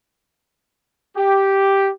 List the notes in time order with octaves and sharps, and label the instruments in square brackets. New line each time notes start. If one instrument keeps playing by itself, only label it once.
[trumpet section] G4